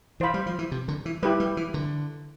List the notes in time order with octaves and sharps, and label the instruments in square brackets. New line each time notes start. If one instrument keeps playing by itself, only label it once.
[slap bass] E3 [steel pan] C5 F5 B5
[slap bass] G3
F3
E3
C3
D3
E3
[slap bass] G3 [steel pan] E4 G4 B4
[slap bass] G3
E3
D3